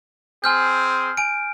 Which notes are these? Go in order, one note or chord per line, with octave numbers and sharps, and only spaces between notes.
C4 G#4 G#5 C6 F6 G6
G#5 D7